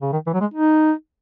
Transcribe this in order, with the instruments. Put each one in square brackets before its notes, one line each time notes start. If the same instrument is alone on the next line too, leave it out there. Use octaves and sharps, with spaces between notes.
[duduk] C#3
D#3
E3
F#3
G#3
D#4